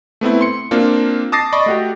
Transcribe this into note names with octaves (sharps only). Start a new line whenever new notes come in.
A3 B3 C4 E4
C6 C#7
A#3 C4 D4 F4
A5 D6 D#6 A6 A#6 C7
D5 D#5 B5 C#6
A3 F#4 G4